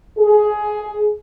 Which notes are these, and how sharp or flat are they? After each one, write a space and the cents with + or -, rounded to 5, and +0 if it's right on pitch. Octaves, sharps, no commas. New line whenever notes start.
G#4 +15